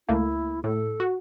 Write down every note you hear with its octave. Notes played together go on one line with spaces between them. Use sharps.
C#2 A3 A#3 E4
A2 A4
F#4